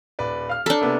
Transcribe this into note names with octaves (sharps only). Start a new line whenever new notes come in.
D#1 B4 D5
F5 F6
D4 A4 A#5
C3 A#3 B3